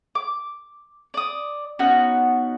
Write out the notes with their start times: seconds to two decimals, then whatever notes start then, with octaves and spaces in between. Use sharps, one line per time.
0.15 D6
1.14 D5 D#6
1.79 B3 C#4 D#4 F#4